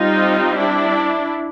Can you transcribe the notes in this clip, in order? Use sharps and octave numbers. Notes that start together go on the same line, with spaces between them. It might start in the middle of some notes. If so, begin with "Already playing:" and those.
Already playing: G3 C4 D#4 F4
D4 E4